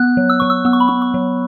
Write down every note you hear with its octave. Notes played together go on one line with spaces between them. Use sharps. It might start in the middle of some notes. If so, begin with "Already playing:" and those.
Already playing: B3 F#6
F#3
E6
F#3 C#6
E6
B3 E6
C#6
B5
B3 C#6
C#6
F#3